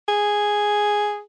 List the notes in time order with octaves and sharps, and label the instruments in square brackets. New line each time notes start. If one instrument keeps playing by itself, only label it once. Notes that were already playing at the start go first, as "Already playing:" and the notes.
[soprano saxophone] G#4